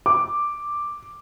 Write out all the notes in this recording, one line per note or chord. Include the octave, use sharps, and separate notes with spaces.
D6